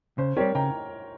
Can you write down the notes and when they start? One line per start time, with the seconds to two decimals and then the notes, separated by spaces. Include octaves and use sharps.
0.18 C#3 C5
0.37 G3 C4 G4 A#4 C#5
0.55 C#3 G5 A#5